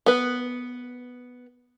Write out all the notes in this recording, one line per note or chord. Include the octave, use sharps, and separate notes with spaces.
B3 B4